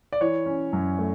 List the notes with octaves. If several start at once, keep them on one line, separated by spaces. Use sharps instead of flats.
D5
E3 C#5
C#4
F#2
A3